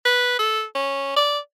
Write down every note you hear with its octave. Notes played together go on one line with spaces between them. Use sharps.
B4
A4
C#4
D5